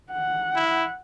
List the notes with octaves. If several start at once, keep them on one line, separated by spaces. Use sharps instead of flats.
F#5
E4